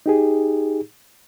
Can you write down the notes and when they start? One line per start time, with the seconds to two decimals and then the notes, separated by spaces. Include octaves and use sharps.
0.06 D#4 G4 G#4